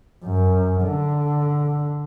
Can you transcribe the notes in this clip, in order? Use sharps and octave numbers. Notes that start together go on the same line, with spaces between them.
F#2
D3